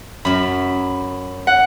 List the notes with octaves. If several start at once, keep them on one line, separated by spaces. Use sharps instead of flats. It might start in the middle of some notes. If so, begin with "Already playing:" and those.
F#2 F#3 B5
F#5